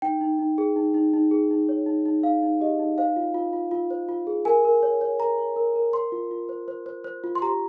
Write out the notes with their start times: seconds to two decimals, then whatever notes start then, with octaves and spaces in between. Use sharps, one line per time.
0.02 D#4 G5
0.21 D#4
0.39 D#4
0.58 G#4
0.76 D#4
0.94 D#4
1.13 D#4
1.31 G#4
1.50 D#4
1.69 C#5
1.86 D#4
2.06 D#4
2.23 D#4 F5
2.42 D#4
2.60 G4 D#5
2.79 D#4
2.98 C5 F5
3.16 F4
3.34 F4
3.53 F4
3.71 F4
3.91 C5
4.09 F4
4.27 G#4
4.45 A#4 G#5
4.65 A#4
4.83 C#5
5.01 C#5
5.20 A#4 A#5
5.38 C#5
5.56 A#4
5.76 A#4
5.93 C5 C6
6.12 F4
6.31 F4
6.49 C5
6.68 C5
6.86 C5
7.04 C5
7.24 F4
7.35 C6
7.42 G4 A#5